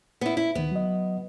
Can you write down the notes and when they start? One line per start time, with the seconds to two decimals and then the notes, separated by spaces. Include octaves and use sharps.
0.21 B3 E4
0.37 E4
0.55 D2 D#3 B3
0.72 F#3 D#5